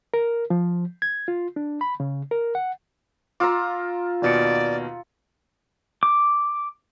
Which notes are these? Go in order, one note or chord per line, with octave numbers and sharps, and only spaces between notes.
A#4
F3
G#6
F4
D4
B5
C#3
A#4
F#5
F4 A#5 D6 E6
D#2 B2 D5 C#7
D6